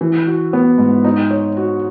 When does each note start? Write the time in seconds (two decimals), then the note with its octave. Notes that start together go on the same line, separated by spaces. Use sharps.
0.01 E3
0.27 F#4
0.53 B3
0.78 G#2
1.04 D#4
1.31 C#5
1.57 F#4